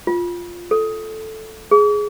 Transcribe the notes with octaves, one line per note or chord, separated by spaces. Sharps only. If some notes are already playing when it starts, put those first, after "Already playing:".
F4
A4
G#4